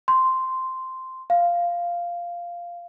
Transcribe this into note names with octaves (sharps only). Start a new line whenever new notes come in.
C6
F5